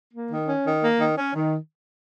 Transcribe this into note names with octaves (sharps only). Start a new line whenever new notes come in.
A#3
D#3
C#4
D#3
A#3
D#3
C#4
D#3